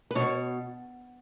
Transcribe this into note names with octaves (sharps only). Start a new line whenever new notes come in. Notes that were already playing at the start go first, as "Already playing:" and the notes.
B4
B2 C#5